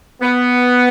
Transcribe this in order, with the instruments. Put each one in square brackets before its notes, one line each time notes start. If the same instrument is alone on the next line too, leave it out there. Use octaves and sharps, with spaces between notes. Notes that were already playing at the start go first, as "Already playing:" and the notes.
[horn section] B3